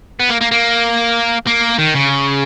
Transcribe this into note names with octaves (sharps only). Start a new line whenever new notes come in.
B3
A#3
A#3
A#3
A#3
D#3
C#3